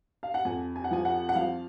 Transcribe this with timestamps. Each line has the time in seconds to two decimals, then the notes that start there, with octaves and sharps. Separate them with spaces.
0.23 F5
0.34 F#5
0.45 F2 G#5
0.76 G#5
0.84 F#5
0.91 F3 G#5
1.05 F#5
1.29 F#5
1.35 F3 F5